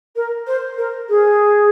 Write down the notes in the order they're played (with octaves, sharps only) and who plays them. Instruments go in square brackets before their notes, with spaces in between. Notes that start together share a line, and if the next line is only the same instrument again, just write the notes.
[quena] A#4
C5
A#4
G#4